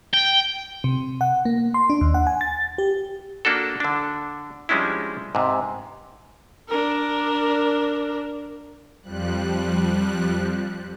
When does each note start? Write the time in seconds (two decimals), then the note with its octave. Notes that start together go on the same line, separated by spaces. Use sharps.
0.13 G5
0.84 C3
1.21 F#5
1.45 A#3
1.74 C6
1.90 D4
2.01 D#2
2.14 F#5
2.27 G#5
2.41 A6
2.78 G4
3.45 A#3 D4 F#4 A4
3.80 D3 D4
4.69 F3 G3 G#3 C#4 D4 E4
5.35 G#2 C3
6.68 D4 A#4
9.02 F2 F3 G3 F#6